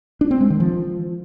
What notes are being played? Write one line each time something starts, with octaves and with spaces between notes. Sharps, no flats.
D4
C4
G#3
D#3
F3